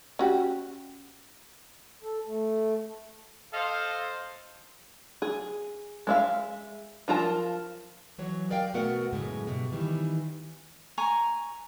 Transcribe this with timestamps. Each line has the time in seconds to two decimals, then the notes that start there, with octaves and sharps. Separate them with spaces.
0.19 C#4 F#4 G4
2.01 A4
2.27 A3
3.54 A4 C5 D#5 F5
5.22 G#4
6.07 G#3 E5 F5
7.08 F3 F4 A#4 A5
8.18 E3 F#3 C#5
8.50 A#4 D5 D#5 F5 G5
8.74 B2 A3 B3 F#4 A#4 F#5
9.13 F#2 A2 C#3 G#3 A3
9.47 G2 B2
9.72 D#3 E3 G3
10.98 G#5 A#5 C#6